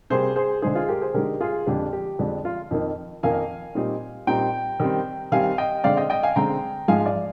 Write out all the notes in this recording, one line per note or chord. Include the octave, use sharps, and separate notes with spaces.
C3 G3 A#3 G#4 C5
G#4 C5
D3 G#3 D#4 G#4 C5
F4 G#4
G4 A#4
G#4 C5
D3 G#3 D#4 G4 A#4
F4 G#4
F2 D3 G#3 D4 G4
G4
F2 D3 G#3 D4
F4
F2 D#3 A#3 D#4
F2 D#3 A#3 D#4 F5 G#5
A#2 G3 C4 D#4
A#2 G3 C4 D#4 G5 A#5
D#3 G3 C4
D#3 G3 C4 F5 G#5
D#5 G5
D3 G#3 C4 D5 F5
D#5 G5
D#5 G5
F5 G#5
D3 G#3 C4 G5 A#5
G#2 F3 G#3 D#4 F5 G#5
D5 F5